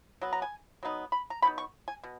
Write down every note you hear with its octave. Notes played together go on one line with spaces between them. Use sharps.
F#3 B3
A#5
G#5
F#3 B3 D#4
B5
A#5
B2 F#3 B3 D#4 B5
C#6
G#5
B2